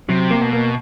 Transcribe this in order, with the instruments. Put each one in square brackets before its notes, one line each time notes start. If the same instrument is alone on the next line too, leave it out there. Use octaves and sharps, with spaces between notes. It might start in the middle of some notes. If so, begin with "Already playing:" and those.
[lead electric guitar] C3 [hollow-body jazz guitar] F#3
[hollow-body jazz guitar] A#3
[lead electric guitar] B2
[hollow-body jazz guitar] A#3